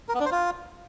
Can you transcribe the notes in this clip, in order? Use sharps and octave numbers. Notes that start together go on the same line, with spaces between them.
A#4
B3
D4
C5
F4